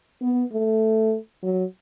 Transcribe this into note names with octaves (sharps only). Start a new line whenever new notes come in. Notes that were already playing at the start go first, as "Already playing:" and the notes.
B3
A3
F#3